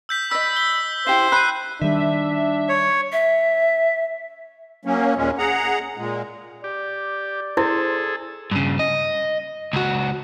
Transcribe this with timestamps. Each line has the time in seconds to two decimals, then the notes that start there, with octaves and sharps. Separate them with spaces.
0.09 E6 G6 B6
0.31 D5 D#5 B5 E6
0.57 G7
1.07 E4 G4 C5 F5
1.32 B5 F#6 C7 D#7
1.81 D#3 G3 D4 E5
2.69 C#5
3.13 E5
4.85 F#3 A#3 C#4
5.17 D#2 A#2 G#3 C#4
5.38 G#4 F#5 A#5
5.97 A#2 G#3
6.64 G4 D5
7.57 E4 G#4 A4 C5
8.51 G2 C#3
8.79 D#5
9.73 C#2 F#4